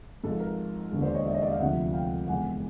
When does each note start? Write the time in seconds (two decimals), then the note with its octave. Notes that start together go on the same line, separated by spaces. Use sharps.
0.23 G#1 G#2 F3 A4
0.40 A#4
0.91 E1 D#2 D3
1.02 C5 D5
1.14 C#5 D#5
1.25 D5 E5
1.34 C#5 D#5
1.42 D5 E5
1.51 D#5 F5
1.59 D2 C3 F3 E5 F#5
1.93 F5 G5
2.27 E1 E2 C#3 F#5 G#5